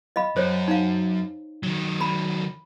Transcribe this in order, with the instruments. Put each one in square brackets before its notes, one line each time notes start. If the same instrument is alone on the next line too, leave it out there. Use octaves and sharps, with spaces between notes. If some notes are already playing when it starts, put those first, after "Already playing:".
[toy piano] D#5 F5 B5
[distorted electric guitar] F#2 [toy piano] C5 C#5
[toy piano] D#4 F5
[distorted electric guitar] D#3 F#3
[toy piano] A#5 B5